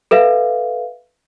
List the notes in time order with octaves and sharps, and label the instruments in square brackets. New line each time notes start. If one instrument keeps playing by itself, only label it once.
[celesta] A4 B4 E5 F5